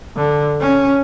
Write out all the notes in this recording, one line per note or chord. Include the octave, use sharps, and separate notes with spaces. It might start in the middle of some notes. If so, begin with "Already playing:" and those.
D3
C#4